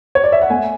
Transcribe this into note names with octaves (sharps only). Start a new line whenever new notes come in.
C#5
D5
E5
F#5
A3 G#5